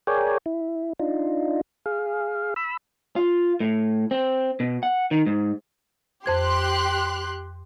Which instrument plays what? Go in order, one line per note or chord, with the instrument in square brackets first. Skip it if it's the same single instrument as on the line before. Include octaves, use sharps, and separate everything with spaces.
[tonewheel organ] G#4 A#4 C#5 D5 G5 G#5
E4
D4 D#4 F4
G#4 F5
B5 E6
[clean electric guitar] F4
A2
C4
B2
F#5
D#3
G#2
[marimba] F2 C5 G#6 [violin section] G4 C6 F#6